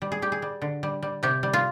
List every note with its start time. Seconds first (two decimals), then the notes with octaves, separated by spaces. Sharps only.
0.02 G3
0.12 G#4
0.22 G3 G4
0.32 G#4
0.42 G3
0.62 D3
0.83 G3
1.02 G3
1.23 C3 G4
1.43 G3
1.53 F4